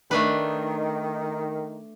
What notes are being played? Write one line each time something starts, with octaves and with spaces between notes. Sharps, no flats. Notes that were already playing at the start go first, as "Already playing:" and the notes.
D#3 A3 D4 B4